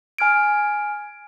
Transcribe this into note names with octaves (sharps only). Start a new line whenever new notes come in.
G#5 F6 G#6 D7